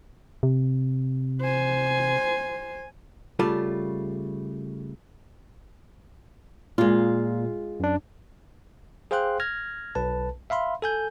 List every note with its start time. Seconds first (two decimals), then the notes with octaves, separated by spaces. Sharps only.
0.43 C3
1.41 C5 G#5
3.39 C#3 G3 A3 F4
6.78 A#2 G#3 F4
7.80 F#2 D4
9.11 G#4 C5 F5 G5 C6 F#6
9.40 F6 G#6 A#6
9.95 B1 B4 A5
10.50 E5 F5 B5 C6
10.82 A4 G#5 G6